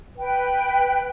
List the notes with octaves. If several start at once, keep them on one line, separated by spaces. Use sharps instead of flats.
B4 G5